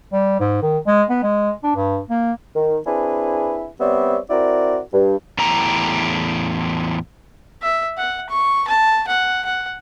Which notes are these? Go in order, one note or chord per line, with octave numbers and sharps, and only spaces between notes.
G3
G#2
D#3
G#3
B3
G#3
D4
G2
A#3
D#3
C4 D4 E4 G#4 B4 G#5
G3 B3 C4 C#5 D5 E5
C4 E4 F#4 A#4 D5
G2
E2 A2 G4 A#5
E5
F#5
C#6
A5
F#5
F#5